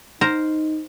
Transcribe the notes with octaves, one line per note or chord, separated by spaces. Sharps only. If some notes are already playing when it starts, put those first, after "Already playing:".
D#4 A#4 C5 A#5